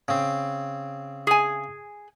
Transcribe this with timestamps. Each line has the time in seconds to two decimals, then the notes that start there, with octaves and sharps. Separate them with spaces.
0.08 C#3 C4
1.27 G#4 G#5